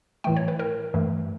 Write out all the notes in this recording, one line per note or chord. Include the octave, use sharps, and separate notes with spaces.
A2 E3 A3 G5
C#5
B4
A#4
G2 E3 A3